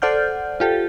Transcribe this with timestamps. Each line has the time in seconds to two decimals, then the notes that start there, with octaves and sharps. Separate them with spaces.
0.02 A4 C5 D5 F#5 F6 G6
0.60 F4 G4 A4